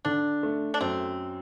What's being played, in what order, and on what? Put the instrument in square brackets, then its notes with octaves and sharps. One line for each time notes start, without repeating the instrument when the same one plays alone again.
[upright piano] D3 [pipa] D4
[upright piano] A3
[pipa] D4
[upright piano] F#2 [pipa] C4